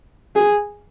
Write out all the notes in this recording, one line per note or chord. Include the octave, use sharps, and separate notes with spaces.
G#4